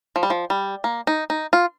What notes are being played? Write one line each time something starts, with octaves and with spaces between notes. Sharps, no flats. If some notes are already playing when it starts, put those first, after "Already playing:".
F3
G3
F3
G3
A#3
D#4
D#4
F4